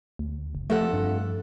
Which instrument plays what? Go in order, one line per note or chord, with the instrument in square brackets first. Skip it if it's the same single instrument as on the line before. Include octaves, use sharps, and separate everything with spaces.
[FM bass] D2
F#1
[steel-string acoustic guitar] F2 A4 F#5 [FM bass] A3
[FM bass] G2